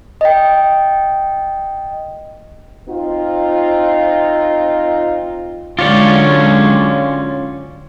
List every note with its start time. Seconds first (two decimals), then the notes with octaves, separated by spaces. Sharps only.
0.21 D#5 G5
2.89 C4 D#4 F4
5.79 D3 F#3 G#3 C#4 F4 G4 C#5 D5